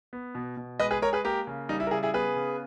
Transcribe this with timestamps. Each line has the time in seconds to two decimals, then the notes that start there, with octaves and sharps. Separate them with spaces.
0.13 B3
0.35 B2
0.57 B2
0.79 G#3 B4 D#5
0.91 G#4 B4
1.01 G#3 A#4 C#5
1.13 G#4 B4
1.24 A#3 G4 A#4
1.47 C#3
1.69 G3 D#4
1.80 E4
1.87 A#4
1.91 C#3 E4 G#4
2.03 E4 G#4
2.14 B3 G#4 B4
2.36 C#3